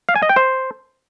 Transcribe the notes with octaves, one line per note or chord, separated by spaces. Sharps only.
F5
G#5
D#5
G5
C5